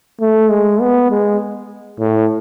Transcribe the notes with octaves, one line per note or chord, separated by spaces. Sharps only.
A3
G#3
B3
G#3
A2